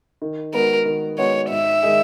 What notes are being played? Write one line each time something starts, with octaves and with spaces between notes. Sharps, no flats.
D#3
G#3 B3 F#4 A#4
D#3
G#3 B3 F#4 C#5
G#2 E5
D#3 G#3 D#4 G#4